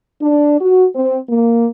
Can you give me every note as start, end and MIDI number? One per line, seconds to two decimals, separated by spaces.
0.22 0.57 62
0.59 0.85 66
0.94 1.18 60
1.29 1.67 58